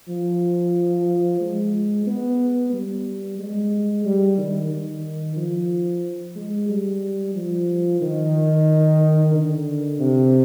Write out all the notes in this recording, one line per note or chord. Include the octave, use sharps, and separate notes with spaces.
F3
G#3
B3
G3
G#3
G3
D#3
D#3
F3
G#3
G3
F3
D#3
D3
C3